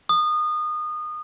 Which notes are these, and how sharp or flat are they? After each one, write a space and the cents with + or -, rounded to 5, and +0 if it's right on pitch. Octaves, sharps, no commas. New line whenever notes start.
D#6 -25